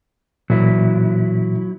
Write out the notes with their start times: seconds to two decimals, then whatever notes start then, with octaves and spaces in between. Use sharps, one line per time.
0.50 A#2 E3 F#3 E4